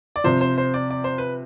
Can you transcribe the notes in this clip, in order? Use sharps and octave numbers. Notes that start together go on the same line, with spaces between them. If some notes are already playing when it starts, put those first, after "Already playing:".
D5
C3 F3 C4 C5
C5
C5
D5
D5
C5
B4